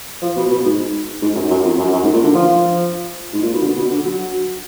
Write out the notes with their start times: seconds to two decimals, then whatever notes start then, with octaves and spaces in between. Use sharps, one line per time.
0.22 F3
0.36 B2
0.51 B2
0.65 G#2
1.22 G#2
1.35 F#2
1.50 F#2
1.64 F2
1.78 F#2
1.92 F#2
2.03 G#2
2.13 A#2
2.24 D3
2.34 F3
3.33 G#2
3.42 A#2
3.53 B2
3.62 D3
3.76 B2
3.90 D3
4.05 F#3